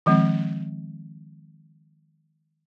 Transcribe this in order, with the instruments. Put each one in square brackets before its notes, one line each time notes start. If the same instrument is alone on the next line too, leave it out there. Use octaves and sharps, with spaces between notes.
[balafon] D#3 F3 G#3 C4